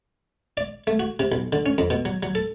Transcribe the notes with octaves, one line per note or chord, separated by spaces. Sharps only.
D5
A3
F#4
C3
B1
D3
C#4
F2
B2
F#3
F#3
A4